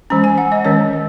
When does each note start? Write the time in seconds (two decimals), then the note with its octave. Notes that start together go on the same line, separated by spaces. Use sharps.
0.10 E3 G#3 C#4 A#5
0.24 G#5
0.38 F#5
0.52 D#5
0.65 D#3 G#3 C#4 C#5